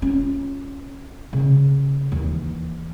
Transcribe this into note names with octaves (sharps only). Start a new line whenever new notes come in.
C#4 F4
C#3
D#2 E3